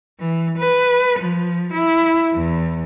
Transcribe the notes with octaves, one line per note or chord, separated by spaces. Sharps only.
E3
B4
F3
E4
E2